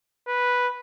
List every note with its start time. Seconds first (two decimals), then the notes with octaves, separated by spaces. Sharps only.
0.28 B4